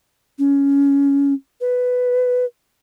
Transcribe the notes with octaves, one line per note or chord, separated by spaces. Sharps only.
C#4
B4